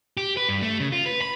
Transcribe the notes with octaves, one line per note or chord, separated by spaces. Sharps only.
G4
B4
G2
A3
C#3
F4
B4
B5